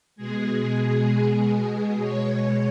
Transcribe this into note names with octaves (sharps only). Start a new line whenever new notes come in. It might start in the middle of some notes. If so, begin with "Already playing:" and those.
B2 G#3 G#4
B2 G#3 C#5